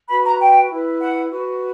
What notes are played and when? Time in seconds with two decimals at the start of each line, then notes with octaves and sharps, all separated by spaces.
0.09 F#4 B4 B5
0.24 A#5
0.39 G5
0.70 E4 B4
1.00 F#5
1.30 F#4 B4